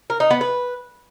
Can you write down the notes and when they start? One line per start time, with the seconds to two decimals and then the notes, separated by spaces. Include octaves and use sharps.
0.10 A#4
0.20 D#4
0.31 B3
0.41 B4